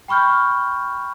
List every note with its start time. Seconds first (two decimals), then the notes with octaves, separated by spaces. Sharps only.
0.08 G5 B5 C#6 F6 G6